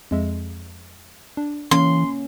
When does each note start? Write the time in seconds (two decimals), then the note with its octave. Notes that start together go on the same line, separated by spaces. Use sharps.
0.11 F2 G#3 E5
1.37 D4
1.71 E3 A#3 C#4 F5 C6